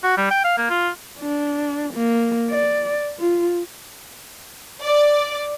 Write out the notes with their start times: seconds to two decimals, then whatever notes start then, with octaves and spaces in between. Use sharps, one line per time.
0.04 F#4
0.17 G3
0.31 G5
0.44 F5
0.58 A#3
0.70 F4
1.20 D4
1.94 A#3
2.50 D5
3.19 F4
4.84 D5